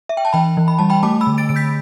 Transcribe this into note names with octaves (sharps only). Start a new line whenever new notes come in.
E5
G5
A5
E3 G5 B5
E3
B5
G3 A5
G5 B5
A3 A5 D6
B5 E6
D3
A6 D7
D3 D7
G6 B6